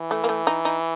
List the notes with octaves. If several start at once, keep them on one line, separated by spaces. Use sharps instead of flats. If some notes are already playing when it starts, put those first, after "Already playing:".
Already playing: E3
A3
A#3
A3
D#4
D#4